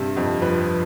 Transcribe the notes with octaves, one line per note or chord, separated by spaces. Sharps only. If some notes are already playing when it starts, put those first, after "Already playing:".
Already playing: G2 C3 G4
F2
F3 B4